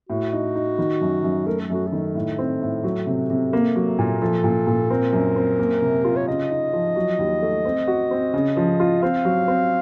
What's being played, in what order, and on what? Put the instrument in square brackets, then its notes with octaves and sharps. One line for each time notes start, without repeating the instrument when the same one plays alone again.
[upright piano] A2 [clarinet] F#4
[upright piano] D#4
D#4
D#3
F#2
F#2
[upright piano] A3 [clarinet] A#4
[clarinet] A4
[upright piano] F#2 [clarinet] F#4
[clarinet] A4
[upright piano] D#3
A2
C4
A2
F#3
C3
C3
A#3
F#3
A#2
[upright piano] F3 [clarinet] A4
[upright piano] A#2
A#2
[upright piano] C4 [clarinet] A#4
[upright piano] F#2
C4
A#3
C3
F4
[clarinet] C#5
[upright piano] C#3 [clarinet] D#5
[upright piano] D#4
F3
F#3
D#2
A3
C4
F#4
C4
C#3
F3
F4
[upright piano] C4 [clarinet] F5
[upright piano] F#3
C4